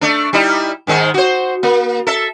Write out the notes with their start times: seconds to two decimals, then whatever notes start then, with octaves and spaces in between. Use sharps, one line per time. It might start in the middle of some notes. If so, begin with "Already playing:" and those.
0.01 A3 D4
0.33 G3 D#4 E4
0.87 G#2 D#3 G#3
1.14 F#4 C5
1.63 A#3
2.07 A4 E5